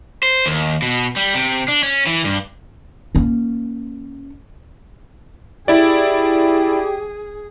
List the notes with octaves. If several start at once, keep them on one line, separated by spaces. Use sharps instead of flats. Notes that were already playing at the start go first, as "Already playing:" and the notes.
C5
D#2
B2
G3
C3
D4
C#4
E3
G2
A#3 C#4
E4 G4 G#4 D5